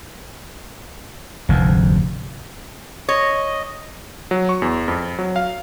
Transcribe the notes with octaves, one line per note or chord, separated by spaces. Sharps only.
F1 D2 G#2
C#5 D#5
F#3
C#6
E2
F2
F#3
F5